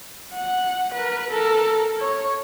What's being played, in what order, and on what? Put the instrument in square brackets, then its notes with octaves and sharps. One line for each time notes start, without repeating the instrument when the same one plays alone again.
[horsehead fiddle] F#5
A#4 B4
A4 A#4
C#5